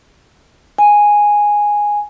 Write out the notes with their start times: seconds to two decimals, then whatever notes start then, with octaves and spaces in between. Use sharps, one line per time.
0.78 G#5